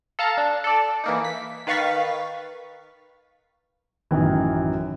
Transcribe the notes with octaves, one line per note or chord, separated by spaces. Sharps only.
A4 F5 A5 A#5
D4
A4 D5
E3 A#3 D#4
B6
D#3 B4 F5 C#6 A6 B6
A1 F#2 D#3 E3